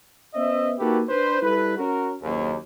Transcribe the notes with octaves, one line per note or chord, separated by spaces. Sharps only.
B3 C#4 C5 D#5 E5
A#3 D#4 F#4 G4 A4 B4
D4 B4 C5
G3 E4 A4 B4
C#4 F#4 A#4
F#1 D#2